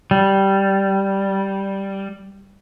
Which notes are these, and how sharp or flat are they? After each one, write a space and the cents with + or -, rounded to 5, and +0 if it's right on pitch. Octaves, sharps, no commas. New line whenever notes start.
G3 -5